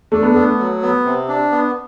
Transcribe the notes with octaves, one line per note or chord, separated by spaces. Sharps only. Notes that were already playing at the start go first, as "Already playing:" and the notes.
A3 D4
B3
A3 B3
F#3
B3
C3
D4
B3